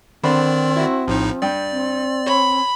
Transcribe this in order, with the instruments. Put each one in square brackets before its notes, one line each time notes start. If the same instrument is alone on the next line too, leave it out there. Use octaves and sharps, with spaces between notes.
[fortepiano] D3 C5 B5 [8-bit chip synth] D#3 D5 [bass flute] C4
[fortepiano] E4 F#4
[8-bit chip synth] A#1 A2 D#4 [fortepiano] F3
[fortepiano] G2 G5 [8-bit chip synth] D5
[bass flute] C4
[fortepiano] C#5 [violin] B5